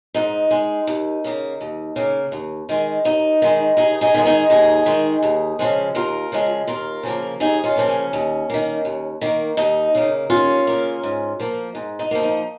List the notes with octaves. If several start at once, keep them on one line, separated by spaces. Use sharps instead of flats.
G#2 D#4
G#3
D#2
C#3 A#3
D#2
C#3 A#3
D#2
D#3 G#3
D#2 D#4
D#3 G#3
D#2 D#4 G#4
D#4 G#4
D#3 G#3
D#4 G#4
D#2 D#4 G#4
D#3 G#3
D#2
C#3 F3 G#3
D#2 F4 A#4
C#3 F3 G#3
D#2 F4 A#4
C#3 F3 A#3
D#2 D#4 G#4
C#4 F4
C#3 F3 A#3
C#4
D#2
D#3 A#3
D#2
D#3 A#3
D#2 D#4
C#3 A#3
D#2 C#4 F4
C#3 A#3
G#2
F3 A#3
G#2
D#4
F3 A#3
D#4